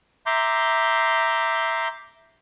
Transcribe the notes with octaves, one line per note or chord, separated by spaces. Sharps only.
E5 A#5 C6 D6 G6